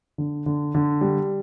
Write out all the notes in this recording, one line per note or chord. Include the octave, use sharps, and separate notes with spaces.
D3
D3
D3
G3